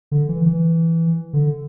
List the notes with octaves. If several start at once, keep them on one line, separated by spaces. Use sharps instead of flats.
D3
E3
E3
D3